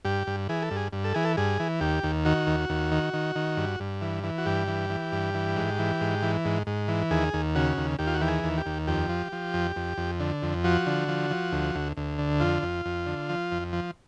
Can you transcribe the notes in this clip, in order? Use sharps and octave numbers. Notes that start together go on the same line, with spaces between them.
G2 G4
G2
E3 G#4
A4
G2
G#4
G2
A4
E3 G#4
A4
G2 G#4
E3
D#2 G4
D#2
D#3 F#4
D#2
D#2
D#3
D#3
D#3
G2
G2
E3
E3
F#4
G2 G4
E3
E3
G2
E3
G#2
E3
G#2
E3
G#2
G#2
E3
D#2 G#4
D#2
C#3 F#4
D#2
D#2 G4
F4
F#4
E3 G4
G#4
D#2
G4
D#2
F2 G4
F3
F3
F2
F2
F2
D3
F2
F3 F#4
D3
F3
F3
D2
D2
D2
D3
F2 F4
F2
F2
D3
F3
F2
F3